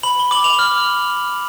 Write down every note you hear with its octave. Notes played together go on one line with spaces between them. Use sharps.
B5 F#7
G7
D6 F#7
F7
F6